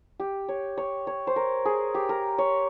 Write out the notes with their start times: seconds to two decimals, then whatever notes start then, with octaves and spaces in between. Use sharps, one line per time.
0.20 G4
0.49 C#5
0.77 C#5
1.07 C#5
1.27 C5
1.36 A#4
1.65 G#4
1.95 G4
2.09 A#4
2.38 C#5